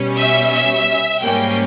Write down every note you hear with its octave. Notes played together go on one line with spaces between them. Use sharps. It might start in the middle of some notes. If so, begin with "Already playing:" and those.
Already playing: B2 G3 C#4
E5
E5
G#2 G3 A#3 C#4 G5